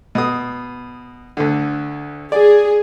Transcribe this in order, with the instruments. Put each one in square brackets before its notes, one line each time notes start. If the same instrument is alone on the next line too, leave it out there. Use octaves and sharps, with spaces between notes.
[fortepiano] B2 D#6
D2 D3
[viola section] G#4 [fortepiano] D5